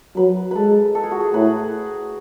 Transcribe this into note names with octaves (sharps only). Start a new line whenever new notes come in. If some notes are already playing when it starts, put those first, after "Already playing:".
F#3 B4
G#3 A4 B4
A4
G#4
F#4
G#4
A2 B4